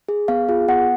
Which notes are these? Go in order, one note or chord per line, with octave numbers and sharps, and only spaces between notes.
G#4
B3 F5
F4 G#4
B3 F#5